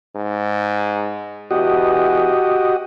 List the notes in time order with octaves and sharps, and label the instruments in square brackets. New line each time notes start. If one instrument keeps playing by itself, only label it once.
[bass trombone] G#2
[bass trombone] E2 [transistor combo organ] F#4 G4 D#5